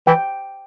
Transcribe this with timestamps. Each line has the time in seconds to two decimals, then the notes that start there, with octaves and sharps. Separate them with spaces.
0.07 E3 G5